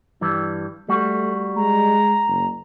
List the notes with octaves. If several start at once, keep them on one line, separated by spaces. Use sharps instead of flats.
G2 E3 G3
G3 A3 F#4
G#3 A#5
F#1